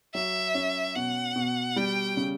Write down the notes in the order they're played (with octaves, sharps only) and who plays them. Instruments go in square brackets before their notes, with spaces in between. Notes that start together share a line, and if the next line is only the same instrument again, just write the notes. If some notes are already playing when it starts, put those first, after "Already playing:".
[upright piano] F#3 [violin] E5
[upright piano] C#4
[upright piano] B2 [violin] F#5
[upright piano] B2
[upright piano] G3 [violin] G5
[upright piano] C#3